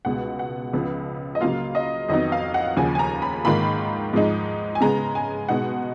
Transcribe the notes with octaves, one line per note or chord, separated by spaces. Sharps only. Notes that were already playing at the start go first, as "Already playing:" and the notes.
C#2 B2 G#3 B3 F#5
F#5
C#2 C#3 F3 B3
D#5
C#3 F#3 A#3 F4 F5
D#5
F2 D#3 F#3 B3 D#4 D#5
F5
F#5
D#2 C#3 F3 G#5
G#5
A#5
B5
G#2 D#3 A#3 F4 B5
G#2 F3 G#3 D#4
G#5
C#3 G#3 B3 A#5
G#5
B2 G#3 D#4 F#5